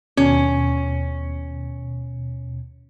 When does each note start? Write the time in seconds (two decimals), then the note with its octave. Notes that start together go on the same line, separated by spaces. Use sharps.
0.17 D#2 B2 C#4